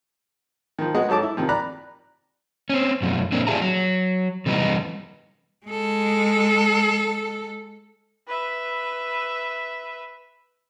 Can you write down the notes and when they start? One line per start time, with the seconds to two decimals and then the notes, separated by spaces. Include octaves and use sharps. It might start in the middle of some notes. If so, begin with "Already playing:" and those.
0.79 D#3 F3
0.95 G#3 B3 F#4 D#5
1.09 G#2 F#3 A4 A5 D6
1.23 E4
1.37 C3 D#3 F3
1.49 D5 A#5 B5 F#6
2.70 C4 C#4
3.02 F#2 B2 F3
3.32 A#2 A#3 C4 D4
3.47 D4 F4 G4 G#4 E5 A#5
3.62 F#3
4.46 C3 E3 G3 B3 D#4
5.66 G#3 A4
8.27 B4 E5